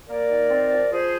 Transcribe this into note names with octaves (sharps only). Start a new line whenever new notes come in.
A#3 A#4 D5
D#3
C4
F3
F3 G#4 C5